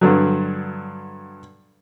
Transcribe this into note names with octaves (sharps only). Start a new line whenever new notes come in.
G2 D3 F#3